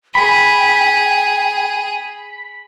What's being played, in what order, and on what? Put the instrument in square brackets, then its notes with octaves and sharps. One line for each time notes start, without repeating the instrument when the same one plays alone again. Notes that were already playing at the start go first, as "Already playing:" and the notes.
[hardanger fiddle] G#4 [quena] G5 [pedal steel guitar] B5